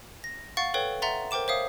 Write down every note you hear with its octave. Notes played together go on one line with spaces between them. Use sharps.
A#6
F5 F#5 C#6 A6
A4 B4 C#5 G5
E5 F#5 A#5 C6 A6
A#4 C5 G5 D6 E7
C5 C#5 E5 F5 D#6